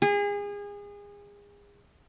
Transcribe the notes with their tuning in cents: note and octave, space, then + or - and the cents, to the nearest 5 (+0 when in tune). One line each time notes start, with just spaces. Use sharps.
G#4 -30